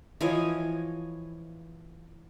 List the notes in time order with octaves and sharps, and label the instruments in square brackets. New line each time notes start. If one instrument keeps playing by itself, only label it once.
[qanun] E3 F3 C#5 D#5